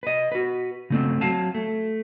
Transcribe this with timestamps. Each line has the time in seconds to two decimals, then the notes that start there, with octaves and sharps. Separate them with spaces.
0.03 B4 D#5
0.32 F#4 B4
0.90 C#3 A3 C4
1.21 F#3 C4 F5 A5
1.55 A3